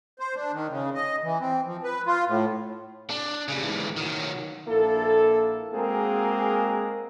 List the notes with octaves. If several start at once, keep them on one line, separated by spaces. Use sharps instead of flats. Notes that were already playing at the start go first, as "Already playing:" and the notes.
C5
D4
D#3
C#3
D#5
E3
C4
F3
B4
F4
A2
D4
C#3 G3
G#2 E3
D#3 F#3
A#1 A#3 E4 A4
G#3 A#3 C4 F#4 G#4 A#4